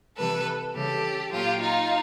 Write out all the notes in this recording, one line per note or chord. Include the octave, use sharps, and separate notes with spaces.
C3 E3 G3 A4 B4
C#3 E3 G3 G4 A4
A#2 F#3 F4 G4
D#4 F4